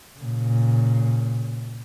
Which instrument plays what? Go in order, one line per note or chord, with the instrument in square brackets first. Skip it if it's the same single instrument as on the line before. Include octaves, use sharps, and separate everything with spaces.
[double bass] A#2 C#3